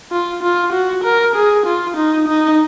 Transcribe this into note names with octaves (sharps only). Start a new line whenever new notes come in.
F4
F4
F#4
A#4
G#4
F4
D#4
D#4